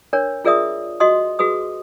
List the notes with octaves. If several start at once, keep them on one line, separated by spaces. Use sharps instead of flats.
D4 A#4 C#5
F4 G#4 A#4 D5 E5 D#6
F#4 D#5 C6 D#6
F#4 G#4 B4 D#6